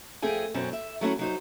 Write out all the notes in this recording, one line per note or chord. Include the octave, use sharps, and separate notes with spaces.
F2 A3 C4 G#4 G5 G#5
F#2 B2 C4 C#4
E5
F#3 A3 C#4 E4
F#3 D#4 C5